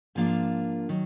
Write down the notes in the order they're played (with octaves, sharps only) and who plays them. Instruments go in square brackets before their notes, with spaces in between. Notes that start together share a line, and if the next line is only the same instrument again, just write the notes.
[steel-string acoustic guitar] G#2 F3 A#3 D4 F4 G#5
D#3 F#3